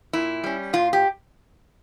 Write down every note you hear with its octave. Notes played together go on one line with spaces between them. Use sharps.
A#2 E4
G3 C#4
A#2 F4
G4